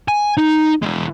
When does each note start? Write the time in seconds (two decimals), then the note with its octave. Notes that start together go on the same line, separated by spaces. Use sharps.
0.08 G#5
0.37 D#4
0.82 E3 G#3